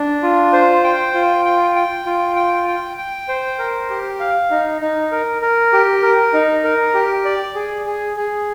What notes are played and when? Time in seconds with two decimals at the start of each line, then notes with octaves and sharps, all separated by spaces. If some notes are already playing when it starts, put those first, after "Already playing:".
Already playing: D4
0.23 F4
0.53 C5
0.84 G5
1.14 F4
1.45 G5
1.75 G5
2.06 F4
2.36 G5
2.68 G5
2.97 G5
3.29 C5
3.59 A#4
3.90 G4
4.20 F5
4.51 D#4
4.81 D#4
5.12 A#4
5.42 A#4
5.73 G4
6.02 A#4
6.33 D#4
6.64 A#4
6.94 G4
7.25 D5
7.55 G#4
7.86 G#4
8.16 G#4